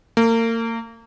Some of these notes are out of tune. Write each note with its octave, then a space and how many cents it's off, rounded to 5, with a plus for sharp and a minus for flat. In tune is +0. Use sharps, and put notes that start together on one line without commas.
A#3 -35